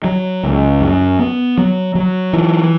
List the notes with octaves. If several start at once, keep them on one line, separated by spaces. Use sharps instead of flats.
F#3
C#2
F#2
B3
F#3
F#3
E3